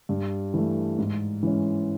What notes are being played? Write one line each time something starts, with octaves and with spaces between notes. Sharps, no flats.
G2
E3 A3
G#2
E3 G#3 C#4